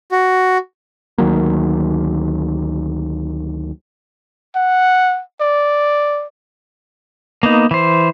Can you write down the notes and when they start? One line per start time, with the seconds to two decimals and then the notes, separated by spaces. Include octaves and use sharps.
0.12 F#4
1.18 D2 D#3 F#3 A#3
4.56 F#5
5.41 D5
7.43 A#3 B3 D#4
7.71 E3 C5